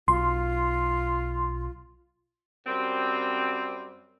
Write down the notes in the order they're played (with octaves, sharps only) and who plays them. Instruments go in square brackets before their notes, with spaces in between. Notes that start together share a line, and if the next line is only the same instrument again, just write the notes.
[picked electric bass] B1 [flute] F4 [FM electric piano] C6
[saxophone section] F#2 G3 C4